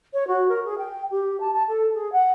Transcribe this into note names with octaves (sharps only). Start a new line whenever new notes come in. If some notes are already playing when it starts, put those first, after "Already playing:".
C#5
F#4
A#4
G#4
G5
G4
A5
A5
A4
G#4
F#5